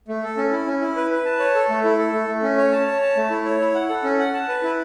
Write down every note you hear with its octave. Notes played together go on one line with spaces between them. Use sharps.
A3
A4
C#4
E4
C#4
E4
B4
B4
A5
C#5
A4
A3
E4
A4
A3
A3
C#4
C#5
A5
C#5
A5
A3
E4
C#5
E4
F#5
A4
C#4
F#5
A5
B4
E4